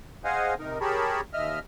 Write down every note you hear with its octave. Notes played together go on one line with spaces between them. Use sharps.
G#4 C5 D#5 F5 F#5 G#5
C3 D#4 A#4
G4 G#4 A#4 C#5 A5 B5
D#2 D#5 E5 F6